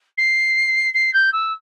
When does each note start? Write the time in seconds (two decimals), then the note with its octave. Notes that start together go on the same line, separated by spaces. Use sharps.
0.17 C7
0.94 C7
1.13 G6
1.32 E6